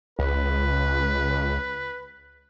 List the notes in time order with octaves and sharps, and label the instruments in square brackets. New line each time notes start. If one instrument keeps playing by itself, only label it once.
[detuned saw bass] C#2 [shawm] B4